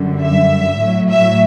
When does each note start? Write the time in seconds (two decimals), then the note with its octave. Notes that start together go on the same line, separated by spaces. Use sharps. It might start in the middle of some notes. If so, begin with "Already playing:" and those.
Already playing: F#2 D3 G3
0.20 E5
0.79 A2 F#3
1.09 E5